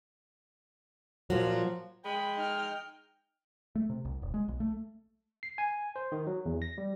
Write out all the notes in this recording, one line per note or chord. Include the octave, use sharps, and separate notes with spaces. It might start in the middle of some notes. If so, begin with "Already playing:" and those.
A#2 F3 F#3
G#3 G5 B5
D#4 F6
A3
C3
C2
D#1
G#3
B1
A3
C7
G#5
C5
D#3
F#3
E2
A#6
G3